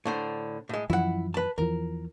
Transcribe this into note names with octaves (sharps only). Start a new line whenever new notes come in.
A2 D3 C5
A2 G#3
F#2 E3 F3 E4 F#5
B4 A5
E2 E3 F3 A#4